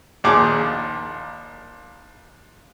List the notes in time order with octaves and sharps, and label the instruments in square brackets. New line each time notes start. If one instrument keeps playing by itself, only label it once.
[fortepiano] A#1 D#2 G#4 D6